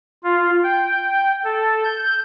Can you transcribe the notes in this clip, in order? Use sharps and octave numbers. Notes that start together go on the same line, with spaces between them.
F4
G5
A4
G6